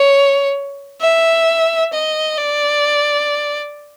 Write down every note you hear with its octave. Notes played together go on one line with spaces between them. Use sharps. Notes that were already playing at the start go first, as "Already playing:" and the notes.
Already playing: C#5
E5
D#5
D5